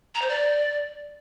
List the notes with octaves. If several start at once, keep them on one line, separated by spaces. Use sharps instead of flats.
A#5
C5
D5